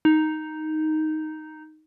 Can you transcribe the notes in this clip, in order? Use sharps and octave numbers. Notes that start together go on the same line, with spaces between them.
D#4